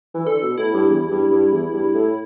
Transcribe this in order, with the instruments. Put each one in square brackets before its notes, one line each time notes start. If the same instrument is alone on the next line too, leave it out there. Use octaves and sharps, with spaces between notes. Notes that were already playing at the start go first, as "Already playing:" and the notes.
[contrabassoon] E3
[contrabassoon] D3 [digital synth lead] A4
[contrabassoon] B2
[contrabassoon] A2 [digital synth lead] E4
[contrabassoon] G2
E2
G2
G2
E2
G2
A2